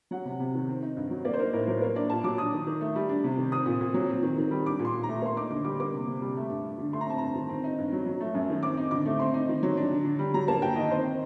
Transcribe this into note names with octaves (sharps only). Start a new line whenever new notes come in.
F#3 F#5
C3
C3
D#3
C4
D#4
G2
F#3
A#3 D5
C5
D#4 A#4
A2 A#4
F#3 A#4
A#3 A#4
D4 D5
A#2 A5
F#3 D6
D4 D#6
D#3
D#3
A3
G3
D4
C3
D#3
C4 D#6
A#2
A#2
F#3
C4
D#3
D#3
G3
D4 D6
A#2
C6
A#2
A#5
A3
A#3 C6
D#4 D6
D3 D6
G3 D6
A#3 D6
C3
C3
G3
A3
G2
G2
D3
A3 C6
A#5
C4 A5
G2 A#5
D#3
C4
D#4
G2
F#3
F#3
A3
F#2
D#3
C4 D6
D#4
D3 D6
A3
C4 C6
D#4
D#3
F#3
D4
D3
D3
G3
F#3 A#5
A#3 A5
G2 G5
D#3 D#5
C4 C5
D#4